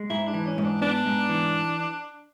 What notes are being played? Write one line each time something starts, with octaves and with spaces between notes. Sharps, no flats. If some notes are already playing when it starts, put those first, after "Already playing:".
Already playing: G#3
G#2 E4
D4
E3
C#4
G#2
D4
B3 D4
G#2
E3